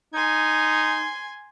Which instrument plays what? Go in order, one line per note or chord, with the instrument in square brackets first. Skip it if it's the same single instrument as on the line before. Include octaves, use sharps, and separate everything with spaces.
[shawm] D#4 [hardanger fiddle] G#5 C6